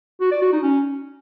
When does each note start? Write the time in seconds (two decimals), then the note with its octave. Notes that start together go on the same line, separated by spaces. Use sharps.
0.21 F#4
0.31 D5
0.42 F#4
0.52 D#4
0.63 C#4